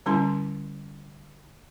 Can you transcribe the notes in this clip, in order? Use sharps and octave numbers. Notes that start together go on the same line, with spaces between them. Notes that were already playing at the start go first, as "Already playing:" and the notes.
D3 G3 C#4 E4 C6